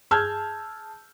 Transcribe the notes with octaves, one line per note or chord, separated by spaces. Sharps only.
G#4 A5 E6 F6 G6 G#6